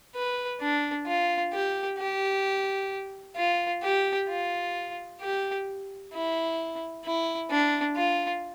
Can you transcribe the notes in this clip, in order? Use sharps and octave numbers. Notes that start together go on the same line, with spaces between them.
B4
D4
F4
G4
G4
F4
G4
F4
G4
E4
E4
D4
F4